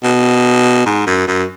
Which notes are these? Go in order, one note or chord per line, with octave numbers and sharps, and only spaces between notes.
B2
G#2
F#2
F#2